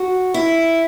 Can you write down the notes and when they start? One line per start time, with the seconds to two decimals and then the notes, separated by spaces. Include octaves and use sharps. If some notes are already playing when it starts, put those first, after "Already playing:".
Already playing: F#4
0.34 E4